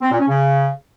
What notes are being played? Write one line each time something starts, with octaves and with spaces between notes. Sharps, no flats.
C4
A#2
C#4
C#3